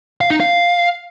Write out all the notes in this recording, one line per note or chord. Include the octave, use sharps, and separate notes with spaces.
F5
D#4
F5